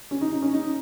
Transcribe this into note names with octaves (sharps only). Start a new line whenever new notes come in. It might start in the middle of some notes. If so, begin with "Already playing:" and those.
C#4
D#4
D#4
C#4
D#4